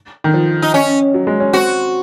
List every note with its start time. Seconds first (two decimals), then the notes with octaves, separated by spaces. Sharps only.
0.24 D#3
0.34 F3
0.62 D#4
0.74 C#4
1.14 F#3
1.27 G#3
1.40 C#4
1.53 C4 F#4